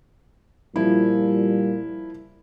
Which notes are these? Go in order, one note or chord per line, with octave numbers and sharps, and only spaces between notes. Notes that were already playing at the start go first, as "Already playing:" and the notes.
A#2 F3 G3 E4